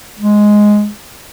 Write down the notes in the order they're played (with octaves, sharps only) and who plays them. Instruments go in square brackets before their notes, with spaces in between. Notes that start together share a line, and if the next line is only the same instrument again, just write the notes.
[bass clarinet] G#3